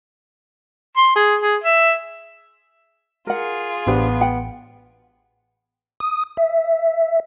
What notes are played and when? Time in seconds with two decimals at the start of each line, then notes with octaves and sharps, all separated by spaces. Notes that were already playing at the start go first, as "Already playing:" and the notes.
0.97 C6
1.15 G#4
1.41 G#4
1.64 E5
3.27 F4 G#4 A#4 F#5
3.87 A1 B3 D4 G4 C5
4.21 F#5 G5
6.00 D#6
6.37 E5